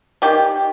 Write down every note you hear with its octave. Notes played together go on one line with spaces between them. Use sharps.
D#3 G4